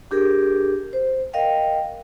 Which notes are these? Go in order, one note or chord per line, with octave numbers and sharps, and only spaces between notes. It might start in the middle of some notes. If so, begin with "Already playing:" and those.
D4 G4 G#4 A#4
C5
A#4 D#5 F5 G5